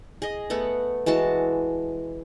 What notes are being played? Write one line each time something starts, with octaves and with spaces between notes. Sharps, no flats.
G#4 D#5
A3 B3 F#5
E3 G#3 F#4 A5